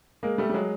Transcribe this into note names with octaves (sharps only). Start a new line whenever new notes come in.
G#3 A#3
G3 A3
G3
F#3 G#3